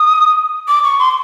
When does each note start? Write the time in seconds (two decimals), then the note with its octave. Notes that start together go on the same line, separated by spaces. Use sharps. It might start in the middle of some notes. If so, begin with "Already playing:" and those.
Already playing: D#6
0.68 D6
0.84 C#6
0.99 C6